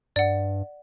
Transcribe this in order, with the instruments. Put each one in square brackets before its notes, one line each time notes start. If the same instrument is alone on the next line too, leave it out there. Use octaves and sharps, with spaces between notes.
[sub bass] G2 [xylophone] D5 F#5